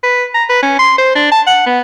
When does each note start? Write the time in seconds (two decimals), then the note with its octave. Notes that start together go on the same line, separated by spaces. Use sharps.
0.03 B4
0.34 A#5
0.49 B4
0.62 C#4
0.79 C6
0.98 C5
1.15 D4
1.32 A5
1.47 F#5
1.66 B3